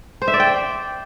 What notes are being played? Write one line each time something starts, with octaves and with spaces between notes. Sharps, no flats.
C5
E5
D5
G5